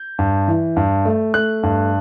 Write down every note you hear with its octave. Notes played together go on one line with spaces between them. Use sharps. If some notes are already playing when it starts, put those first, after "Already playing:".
Already playing: G6
G2
E3
G2
A3
A3 F#6
G2